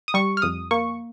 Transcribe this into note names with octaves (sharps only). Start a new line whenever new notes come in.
D#6
G3 C#6
F6
F2 D#6
A#3 C#6